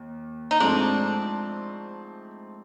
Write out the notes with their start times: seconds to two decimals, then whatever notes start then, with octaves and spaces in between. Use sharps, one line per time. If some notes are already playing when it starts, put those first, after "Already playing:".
Already playing: D#2
0.51 D#4
0.60 G#2 F3 A3 C4 D4